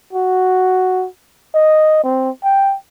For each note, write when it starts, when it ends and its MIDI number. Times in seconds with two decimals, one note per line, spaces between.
0.13 1.06 66
1.55 2.02 75
2.03 2.30 60
2.44 2.75 79